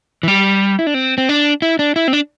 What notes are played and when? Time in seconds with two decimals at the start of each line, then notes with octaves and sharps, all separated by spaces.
0.23 E3
0.28 G3
0.79 E4
0.87 D4
0.94 C4
1.18 C4
1.29 D4
1.62 E4
1.79 D4
1.96 E4
2.08 C4
2.13 D4